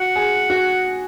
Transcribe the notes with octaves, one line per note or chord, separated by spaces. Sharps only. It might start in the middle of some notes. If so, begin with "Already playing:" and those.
Already playing: F#4 F#5
G#4
F#4